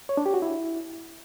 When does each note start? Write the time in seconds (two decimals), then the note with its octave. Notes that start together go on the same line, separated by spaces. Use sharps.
0.09 C#5
0.17 D4
0.26 G4
0.34 F#4
0.42 E4